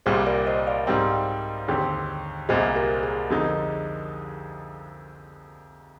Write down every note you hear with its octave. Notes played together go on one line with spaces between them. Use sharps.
C2 A#2 G3 G#4 C5
A#4 D5
C5 D#5
D5 F5
G#2 G3 C4
D#2 D3 G#3 C4 G4
C2 A#2 G#3 C5 D#5
G4 A#4
G#4
F2 D3 G#3 D#4